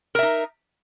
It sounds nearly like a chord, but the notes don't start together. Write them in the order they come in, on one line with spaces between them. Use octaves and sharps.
A#4 E5 D#4